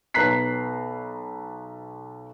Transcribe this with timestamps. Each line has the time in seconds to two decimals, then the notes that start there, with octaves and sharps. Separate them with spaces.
0.14 B1 B4 A#5 F#6 B6 C7